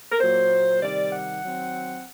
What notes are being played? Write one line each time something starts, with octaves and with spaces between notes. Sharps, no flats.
A#4
A#2 F#3 A#3 C5
C3 D#3 G3 D5
F#5
D#3 F#3 C4